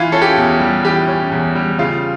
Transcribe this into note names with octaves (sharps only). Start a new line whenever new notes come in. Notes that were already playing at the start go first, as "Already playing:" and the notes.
Already playing: E3 F4
C#4 A4
G4
E2
G3
E3 G4
C#4
E2
G3
C#3 F4